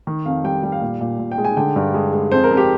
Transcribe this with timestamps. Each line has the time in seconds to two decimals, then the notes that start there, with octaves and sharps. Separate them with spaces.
0.07 D#3
0.26 F2 F5
0.44 G3 G5
0.63 G3 G5
0.72 F5
0.82 A#2
1.01 A#2
1.19 A#2
1.32 G5
1.38 G#3
1.45 G#5
1.57 D3 G5
1.76 G2
1.94 G#3
2.13 G#3
2.32 F2 C5
2.44 A#4
2.51 F2
2.57 G4